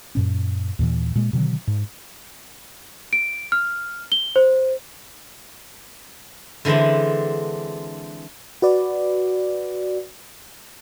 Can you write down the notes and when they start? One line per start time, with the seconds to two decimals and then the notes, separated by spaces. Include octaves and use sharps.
0.15 F#2 A#2 C#4
0.79 D#2 A#2 E3
1.15 A#2 G#3
1.33 B2 D3 D#3 F#3
1.67 G#2
3.13 D7
3.52 F6
4.12 G7
4.36 C5
6.65 D3 E3 G#3 C4 D4
8.62 F#4 B4 D5